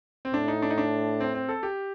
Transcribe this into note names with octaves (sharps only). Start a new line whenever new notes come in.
C4
A2 D4
D#4
D4
D#4
D4
C4
C4
A4
G4